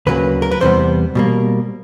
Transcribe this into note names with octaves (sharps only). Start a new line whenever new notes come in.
D2 C#3 F#3 A#3 B4
A#4
B4
E2 C3 E3 G3 B3 C5
B2 G3 A#3